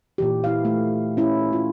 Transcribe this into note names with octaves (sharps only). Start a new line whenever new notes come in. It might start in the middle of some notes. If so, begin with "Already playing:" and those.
A#2 E3 G4
E4 F5
A3
C#4 E4
F4